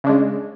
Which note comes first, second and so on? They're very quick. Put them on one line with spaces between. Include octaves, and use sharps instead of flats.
C#3 D4 G#3